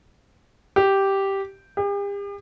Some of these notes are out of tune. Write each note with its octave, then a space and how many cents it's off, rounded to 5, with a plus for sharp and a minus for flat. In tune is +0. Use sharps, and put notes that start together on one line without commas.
G4 -5
G4 +45